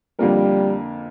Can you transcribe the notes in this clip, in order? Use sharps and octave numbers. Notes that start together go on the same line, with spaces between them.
F2 D3 G3 A#3 F4 A#4